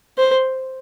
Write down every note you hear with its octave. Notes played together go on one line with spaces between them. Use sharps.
C5